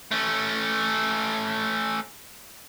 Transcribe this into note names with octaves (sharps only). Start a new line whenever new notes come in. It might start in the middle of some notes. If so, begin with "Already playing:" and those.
A3 C#4